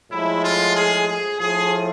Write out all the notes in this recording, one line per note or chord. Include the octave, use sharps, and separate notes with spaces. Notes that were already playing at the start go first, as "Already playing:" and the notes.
A2 F3 G#3 E4
F4
G#4
G#4
A2 F3 A3 G#4